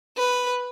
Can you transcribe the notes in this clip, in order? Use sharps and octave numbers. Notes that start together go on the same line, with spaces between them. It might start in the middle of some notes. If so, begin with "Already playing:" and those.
B4